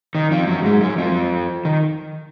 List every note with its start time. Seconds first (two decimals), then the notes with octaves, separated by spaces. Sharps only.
0.15 D#3
0.31 F2 F3
0.47 F#2 F#3
0.64 G#2 G#3
0.81 F#2 F#3
0.98 F2 F3
1.65 D#3